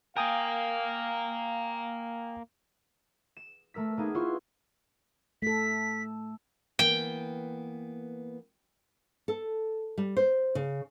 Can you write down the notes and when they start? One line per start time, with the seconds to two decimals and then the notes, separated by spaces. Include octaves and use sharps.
0.16 A#3 A#4 F5 G5 G#5 D#6
3.37 E7
3.74 A3 A#4 E6 B6
3.97 A#3 B3 D#4 G#4
4.14 E4 F4 B4 C5 C6 C#6
5.42 A3 A4 B6
6.79 E3 A#3 B3 G5
9.28 A4
9.98 G3
10.17 C5
10.55 C#3